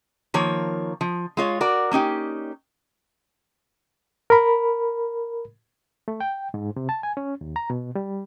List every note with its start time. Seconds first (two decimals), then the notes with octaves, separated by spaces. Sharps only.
0.34 D#3 F3 A#3 C#5
1.01 F3
1.37 G#3 F4 C#5
1.61 F#4 A#4 D5
1.91 A#3 C#4 D#4 G4
4.30 A#4 B5
6.08 A3
6.20 G5
6.54 G#2
6.76 C3
6.89 A5
7.03 G#5
7.17 C#4
7.41 D#2
7.56 A#5
7.70 B2
7.95 G3